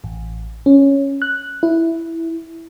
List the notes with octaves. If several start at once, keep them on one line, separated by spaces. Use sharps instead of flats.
A1
C#4
F#6
E4